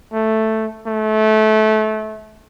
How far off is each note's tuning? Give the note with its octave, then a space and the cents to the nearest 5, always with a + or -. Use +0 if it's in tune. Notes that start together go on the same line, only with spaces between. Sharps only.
A3 +0
A3 -25